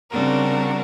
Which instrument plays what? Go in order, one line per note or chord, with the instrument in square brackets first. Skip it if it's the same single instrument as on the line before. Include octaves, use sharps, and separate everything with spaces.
[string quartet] C#3 G3 C4 D4 F#4 A#4